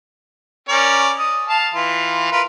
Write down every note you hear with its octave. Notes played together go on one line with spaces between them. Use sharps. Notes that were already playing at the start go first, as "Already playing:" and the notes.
C#4 A#4 D5
D#5
F5 A5
E3 F4
F4 A#4 B4